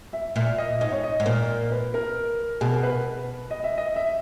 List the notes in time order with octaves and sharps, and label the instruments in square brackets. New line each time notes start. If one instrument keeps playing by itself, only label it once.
[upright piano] E5
[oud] A#2 [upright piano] E5
[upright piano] D#5
[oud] G#2 [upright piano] D#5
[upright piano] C#5
D#5
[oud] G#2
[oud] A#2 [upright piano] A#4
[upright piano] B4
A#4
[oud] B2 [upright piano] G#4
[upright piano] A#4
B4
D#5
E5
D#5
E5